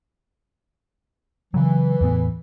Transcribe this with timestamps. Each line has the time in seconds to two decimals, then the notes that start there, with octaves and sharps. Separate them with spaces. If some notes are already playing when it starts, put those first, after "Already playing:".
1.54 C#3 E3 F#3
2.01 E2 A2 B3